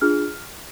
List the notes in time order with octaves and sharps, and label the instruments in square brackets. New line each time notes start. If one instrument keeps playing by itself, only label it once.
[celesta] D4 F4 G#4 F6